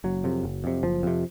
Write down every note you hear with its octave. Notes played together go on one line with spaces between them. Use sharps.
F#1 F#3
F2 C3
F#1
F2 C3
F#1 F3
F2 C3